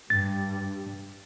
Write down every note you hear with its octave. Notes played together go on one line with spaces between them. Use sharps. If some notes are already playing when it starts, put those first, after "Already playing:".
G2 A6